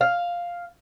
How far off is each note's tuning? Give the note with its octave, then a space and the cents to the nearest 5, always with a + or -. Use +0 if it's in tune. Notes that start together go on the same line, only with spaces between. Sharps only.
F5 +0